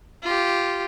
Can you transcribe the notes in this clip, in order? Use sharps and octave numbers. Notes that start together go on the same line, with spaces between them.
F4 G4